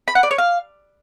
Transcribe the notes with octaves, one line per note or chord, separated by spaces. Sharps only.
B5
F#5
D5
C#5
F5